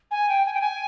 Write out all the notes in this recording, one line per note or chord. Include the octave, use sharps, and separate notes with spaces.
G#5
G5
G#5
G5
G#5